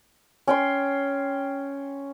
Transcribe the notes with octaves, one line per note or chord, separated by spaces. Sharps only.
C#4 G5 C6